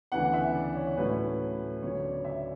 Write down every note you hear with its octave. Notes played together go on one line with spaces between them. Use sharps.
D2 C#3 E3 B3 D4 F#5
E5
D5
C#5
A2 F#3 C#4 B4
D2 C#3 F#3 C#5
D5
E5